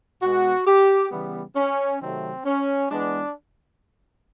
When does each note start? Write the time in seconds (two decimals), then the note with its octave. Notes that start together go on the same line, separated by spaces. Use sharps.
0.22 B2 G#3 B3 F#4
0.67 G4
1.11 C#3 E3 G3 B3
1.56 C#4
2.00 C3 D#3 F#3 A3 C4
2.45 C#4
2.90 E3 G#3 B3 D4